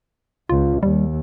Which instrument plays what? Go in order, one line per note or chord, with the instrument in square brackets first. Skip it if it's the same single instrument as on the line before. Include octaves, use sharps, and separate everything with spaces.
[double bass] C#2 [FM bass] F4
[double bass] D#2 [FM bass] G3